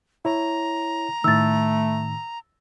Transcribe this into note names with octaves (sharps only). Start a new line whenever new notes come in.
E4 C#5 A#5
A2 D#3 A3 E6 A6